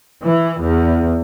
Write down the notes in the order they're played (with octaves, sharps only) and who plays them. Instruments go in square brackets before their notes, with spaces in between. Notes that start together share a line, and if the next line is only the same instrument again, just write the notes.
[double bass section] E3
E2